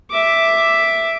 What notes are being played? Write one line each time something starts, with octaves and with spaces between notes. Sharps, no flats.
E5 D6